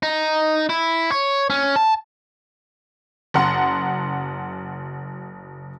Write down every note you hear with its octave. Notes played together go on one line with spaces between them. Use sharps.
D#4
E4
C#5
C#4
A5
F#1 F#5 C6